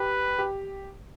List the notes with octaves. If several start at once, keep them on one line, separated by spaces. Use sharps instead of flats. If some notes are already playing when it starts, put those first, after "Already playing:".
Already playing: G4 B4
G4